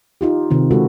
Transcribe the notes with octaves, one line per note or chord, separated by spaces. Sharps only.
D#4 F4 G4
C3 D#3 C4
C#3 G#3 F4 F#4 A4 B4